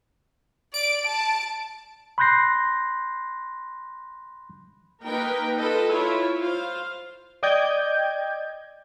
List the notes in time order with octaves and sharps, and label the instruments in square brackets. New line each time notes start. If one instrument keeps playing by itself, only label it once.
[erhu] D5 [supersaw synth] D7
[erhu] A5
[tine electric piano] B5 C6 F#6 G6 A#6 C7
[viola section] A#3 D#4 A#4 B4 G5
F4 A4 B4 D#5
E4 F4 C#5
F4 C5 F5
[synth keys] D5 D#5 G5 G6 G#6